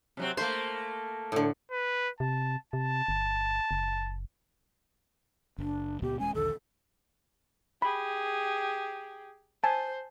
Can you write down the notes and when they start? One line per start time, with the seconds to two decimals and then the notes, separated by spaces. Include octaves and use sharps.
0.17 C3 F#3 C4
0.37 A3 A#3 C5
1.32 A2 D3
1.71 B4
2.20 C3 A5
2.73 C3 A5
3.08 G1
3.71 F#1
5.58 F#1 D4
6.02 C#2 A#2 B3 G4
6.19 D#1 G#3 C#4 G#5
6.35 A#1 D#2 D3 A4
7.82 G4 G#4 B5
9.64 C5 G#5 A5